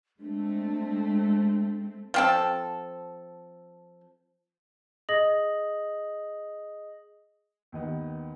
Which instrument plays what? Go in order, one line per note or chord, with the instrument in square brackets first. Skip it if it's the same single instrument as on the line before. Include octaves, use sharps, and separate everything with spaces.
[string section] G#3 A3 C4 [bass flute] D4
[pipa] F3 C4 A4
[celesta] G#4 D#5 D#6 A#6 F#7
[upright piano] D#2 D#3 B3